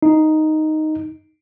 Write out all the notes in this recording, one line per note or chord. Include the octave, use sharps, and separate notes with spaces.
D#4